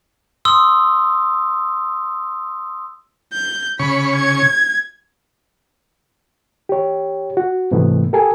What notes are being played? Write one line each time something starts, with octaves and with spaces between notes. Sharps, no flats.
C6 D#6 E6
G6
C#3 B5 C#6
G#6
G4 C#5
F#4
G#2 C3 E3 A3 B3
G4 A4 A#4 G#5